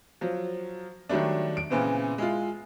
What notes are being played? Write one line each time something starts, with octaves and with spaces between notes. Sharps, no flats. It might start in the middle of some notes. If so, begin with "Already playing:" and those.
F3 F#3
D#3 F#3 G3 A3 D4
D7
A#2 C#3 E3 B3 C4
G#3 E4 F4